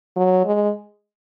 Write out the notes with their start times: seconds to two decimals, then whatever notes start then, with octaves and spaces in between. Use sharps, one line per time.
0.16 F#3
0.45 G#3